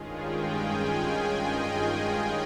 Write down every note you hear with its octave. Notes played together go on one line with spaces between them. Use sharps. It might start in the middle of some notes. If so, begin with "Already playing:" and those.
Already playing: G2 D#3 G#3 C#4 F4 G#4
G5
G#5
G5
D#5